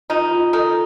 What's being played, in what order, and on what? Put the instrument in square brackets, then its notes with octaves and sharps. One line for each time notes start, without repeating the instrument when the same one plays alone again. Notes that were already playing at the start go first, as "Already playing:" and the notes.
[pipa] D#3 D#4 [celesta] F4
[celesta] F4
[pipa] D#3 D#4 [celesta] A4